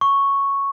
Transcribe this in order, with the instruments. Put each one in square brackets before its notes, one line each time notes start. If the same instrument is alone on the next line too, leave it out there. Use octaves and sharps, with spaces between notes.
[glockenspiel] C#6